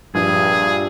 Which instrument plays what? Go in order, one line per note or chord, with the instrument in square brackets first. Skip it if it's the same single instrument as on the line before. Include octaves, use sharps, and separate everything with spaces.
[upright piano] A#1 [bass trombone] G2 [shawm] G#4